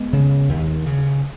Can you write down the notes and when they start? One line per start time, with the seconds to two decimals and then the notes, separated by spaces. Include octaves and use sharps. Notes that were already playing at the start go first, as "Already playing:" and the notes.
Already playing: G#3 B3
0.13 C#3
0.49 D#2
0.86 C#3